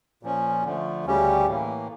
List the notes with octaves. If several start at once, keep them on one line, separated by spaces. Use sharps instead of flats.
A#2 F3 C#4
D3 F3 A3
D2 C#3 G3 C#4 G4
A2 E3 A#3